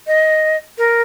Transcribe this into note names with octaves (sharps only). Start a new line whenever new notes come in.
D#5
A#4